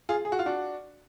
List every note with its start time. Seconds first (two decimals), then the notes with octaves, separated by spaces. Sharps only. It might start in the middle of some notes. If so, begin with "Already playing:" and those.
0.09 F4 G#4
0.25 G#4
0.32 F#4
0.39 F4
0.46 D4 F#4